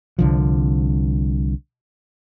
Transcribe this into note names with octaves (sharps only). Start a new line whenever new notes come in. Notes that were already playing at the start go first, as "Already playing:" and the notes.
C2 D3 F3